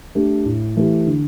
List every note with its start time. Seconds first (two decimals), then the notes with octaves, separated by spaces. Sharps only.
0.15 A3 D4 G4
0.45 A2
0.76 E3 A3 E4 G4
1.07 D3